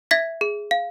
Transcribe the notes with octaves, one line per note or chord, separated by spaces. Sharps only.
E5 G#6 B6
G#4
F5